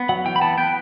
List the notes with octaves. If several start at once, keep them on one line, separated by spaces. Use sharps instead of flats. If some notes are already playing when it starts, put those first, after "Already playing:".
Already playing: B3
F#3 F#5
E3 G5
B5
B3 A5
B3 G5